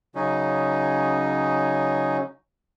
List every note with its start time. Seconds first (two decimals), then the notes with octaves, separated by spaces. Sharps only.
0.15 C#3 F#3 C#4 D#4